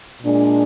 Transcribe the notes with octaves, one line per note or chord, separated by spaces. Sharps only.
A#2 G#3 D4